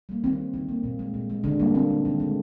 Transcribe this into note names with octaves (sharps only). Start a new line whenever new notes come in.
G3 A#3
D#3 C4
A#3
D#3
A#3
A#2
G#3
A#2
G#3
D3 D4
G3 A#3
D3 C4
G3 A#3
D#3
G#3